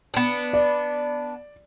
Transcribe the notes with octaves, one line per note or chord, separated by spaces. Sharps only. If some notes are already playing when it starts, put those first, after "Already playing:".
B3 D4
D5